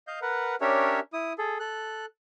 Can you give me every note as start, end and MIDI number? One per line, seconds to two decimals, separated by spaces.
0.07 0.19 75
0.07 0.19 77
0.07 0.19 91
0.22 0.55 70
0.22 0.55 71
0.22 0.55 78
0.61 1.00 61
0.61 1.00 62
0.61 1.00 67
0.61 1.00 70
0.61 1.00 73
0.61 1.00 76
1.13 1.33 64
1.13 1.33 87
1.38 1.58 68
1.38 1.58 69
1.60 2.06 69
1.60 2.06 90